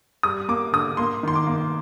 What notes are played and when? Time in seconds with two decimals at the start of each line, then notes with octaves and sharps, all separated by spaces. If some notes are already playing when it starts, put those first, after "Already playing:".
0.23 G3 D#6
0.48 A#3 D6
0.73 D3 D#6
0.97 A#3 C6
1.23 D#3 C6
1.35 D6
1.47 A#3